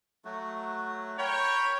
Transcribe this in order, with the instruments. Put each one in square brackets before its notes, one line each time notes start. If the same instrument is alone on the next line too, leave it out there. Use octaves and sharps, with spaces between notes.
[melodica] F#3 A3 F#4
[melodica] A#4 B5 [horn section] C#5 G5